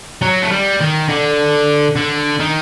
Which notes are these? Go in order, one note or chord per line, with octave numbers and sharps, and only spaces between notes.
F#3
A3
G3
D#3
D3
D3
D#3